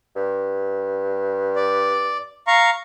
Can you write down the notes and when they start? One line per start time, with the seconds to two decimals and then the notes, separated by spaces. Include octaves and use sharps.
0.16 G2
1.56 D5
2.47 F5 A#5 C#6